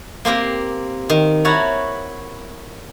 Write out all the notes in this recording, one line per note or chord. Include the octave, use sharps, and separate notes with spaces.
A#3 C4 G4 A#4
D#3
E4 F#4 C#5 A5 A#5